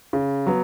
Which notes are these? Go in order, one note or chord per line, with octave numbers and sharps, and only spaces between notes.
C#3
F#3 B3